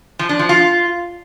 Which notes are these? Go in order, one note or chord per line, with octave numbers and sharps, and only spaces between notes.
F3
D4
F3
F4